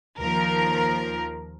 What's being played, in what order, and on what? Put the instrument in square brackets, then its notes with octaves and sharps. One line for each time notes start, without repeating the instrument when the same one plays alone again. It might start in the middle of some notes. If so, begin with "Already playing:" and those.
[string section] D#2 F3 A#4